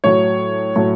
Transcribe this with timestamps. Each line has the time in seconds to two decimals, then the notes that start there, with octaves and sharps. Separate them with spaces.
0.04 A2 F#3 C#5
0.76 A2 F#3